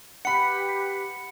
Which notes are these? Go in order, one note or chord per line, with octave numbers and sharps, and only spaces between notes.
G4 B4 F#5 B5 C#7